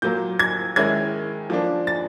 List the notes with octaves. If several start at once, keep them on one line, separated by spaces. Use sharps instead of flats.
A#2 F#3 A#3 G6
G#6
D#3 G#3 C#4 E4 G#6
F3 A#3 D4
A6